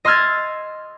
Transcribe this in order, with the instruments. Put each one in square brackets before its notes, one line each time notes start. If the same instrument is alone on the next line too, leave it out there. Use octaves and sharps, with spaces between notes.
[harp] D#5 C6 E6 F6 G#6 A6